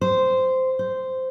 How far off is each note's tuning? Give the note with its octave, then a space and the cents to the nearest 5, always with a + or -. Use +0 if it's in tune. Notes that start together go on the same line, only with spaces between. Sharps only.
C5 -10
C5 -10